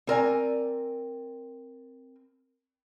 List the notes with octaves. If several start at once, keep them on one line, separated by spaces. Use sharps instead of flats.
C4 A#4 D5 G#5